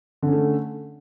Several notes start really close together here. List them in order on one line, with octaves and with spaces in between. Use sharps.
D3 C#4 A3